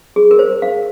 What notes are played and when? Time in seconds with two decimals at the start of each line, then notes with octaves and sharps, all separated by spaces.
0.16 G#4
0.31 A#4
0.39 C5
0.62 F5